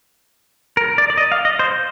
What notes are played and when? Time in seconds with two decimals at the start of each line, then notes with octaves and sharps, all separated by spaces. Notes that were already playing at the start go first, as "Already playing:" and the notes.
0.77 A#4
0.98 D5
1.10 D5
1.18 D#5
1.32 F5
1.45 D#5
1.59 C5